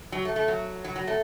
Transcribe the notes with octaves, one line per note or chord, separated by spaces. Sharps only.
F#3
A3
A3
F#3
F#3
F#3
A3